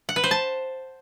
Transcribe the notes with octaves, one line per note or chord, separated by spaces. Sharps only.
F#5
B4
C5
A5